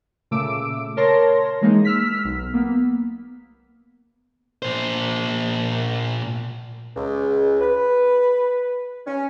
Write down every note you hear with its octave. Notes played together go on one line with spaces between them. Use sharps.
A#2 C#3 A3 D6 E6 D7
A#4 C#5 A5 C6 A#6
E3 G#3 A#3 D#4
E6 F6 B6
B1
A#3 B3
A#2 C5
C#2
B4
C#4